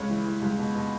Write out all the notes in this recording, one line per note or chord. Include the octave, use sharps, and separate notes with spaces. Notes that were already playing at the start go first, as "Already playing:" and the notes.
Already playing: C#2 C#5
E3
E3
C#2
B2
B2